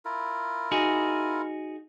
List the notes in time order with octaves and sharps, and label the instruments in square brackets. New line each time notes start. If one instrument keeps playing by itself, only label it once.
[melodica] E4 F4 A#4
[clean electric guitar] D#4 F#4 G#4